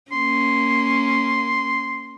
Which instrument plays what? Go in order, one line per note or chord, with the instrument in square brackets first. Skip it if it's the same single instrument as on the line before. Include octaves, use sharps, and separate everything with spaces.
[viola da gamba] A#3 C#4 [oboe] C6